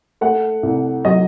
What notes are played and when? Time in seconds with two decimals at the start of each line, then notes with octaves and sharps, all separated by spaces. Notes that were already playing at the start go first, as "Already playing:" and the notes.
0.21 A3 F#5
0.63 C2
1.05 F#3 D#5